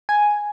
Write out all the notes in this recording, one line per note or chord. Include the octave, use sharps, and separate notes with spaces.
G#5